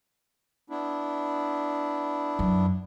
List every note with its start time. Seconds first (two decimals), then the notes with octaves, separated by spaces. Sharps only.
0.70 B3 D4 E4
2.39 F#2